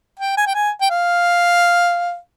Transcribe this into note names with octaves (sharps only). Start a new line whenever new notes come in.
G5
G#5
G5
G#5
G5
F5